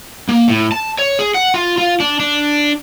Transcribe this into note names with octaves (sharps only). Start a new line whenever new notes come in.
A#3
A2
A5
C#5
G#4
F#5
F4
F4
D4
D4